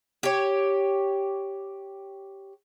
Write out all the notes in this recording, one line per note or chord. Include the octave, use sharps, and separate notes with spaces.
G4 C#5